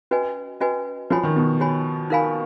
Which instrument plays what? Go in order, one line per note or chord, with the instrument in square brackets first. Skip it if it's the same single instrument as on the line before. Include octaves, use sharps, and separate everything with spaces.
[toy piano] C#4 F#4 B4 D#5 G#5
C#4 F#4 B4 D#5 G#5
[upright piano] F3 [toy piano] F#4 C#5 G#5 B5
[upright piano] D#3
B2
[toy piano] F#4 C#5 G#5 B5
D#4 A#4 F5 G#5 B5